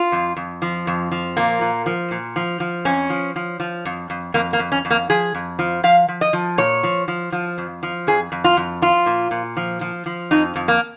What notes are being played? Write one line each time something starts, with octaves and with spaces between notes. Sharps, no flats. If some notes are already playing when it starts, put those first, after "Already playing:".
Already playing: F4
F2
F2
F3
F2
F3
A#2 A#3
A#2
F3
A#2
F3
F3
F2 C#4
F3
F3
F3
F2
F2
F2 A#3
A#3
F2
C#4
F2
A#3
F3 G#4
F2
F3
F3 F5
F3
D#5
F3
A#2 C#5
F3
F3
F3
F2
F3
F2 G#4
F2
F4
F2
F3 F4
A#2
A#2
F3
F3
F3
F2 D#4
F2
A#3